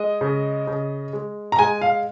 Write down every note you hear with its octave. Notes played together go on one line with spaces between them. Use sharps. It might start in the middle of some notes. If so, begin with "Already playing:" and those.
Already playing: G#3 D#5
C#3
C#3
G#3
A#5
G#3 G#5
F5